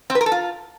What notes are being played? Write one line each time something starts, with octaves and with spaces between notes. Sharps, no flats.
C4
B4
A#4
A4
F4